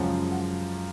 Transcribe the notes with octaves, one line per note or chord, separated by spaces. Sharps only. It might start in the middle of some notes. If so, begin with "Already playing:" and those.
Already playing: F#2 C#3 F3 G#3 C#4 F#5
F#5